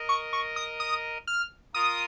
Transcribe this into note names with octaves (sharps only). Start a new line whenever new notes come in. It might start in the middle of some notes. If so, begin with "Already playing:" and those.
Already playing: A#4 D#5
C#6
C#6
D#6
D#6
F6
F4 A#4 D#6